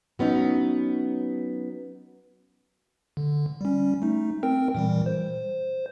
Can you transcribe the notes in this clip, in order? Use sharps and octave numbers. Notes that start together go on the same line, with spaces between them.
F#3 B3 C#4 D#4
D3
G3 C#4
A3 D#4
C4 A#4 G5
A#2 E3 G3
C5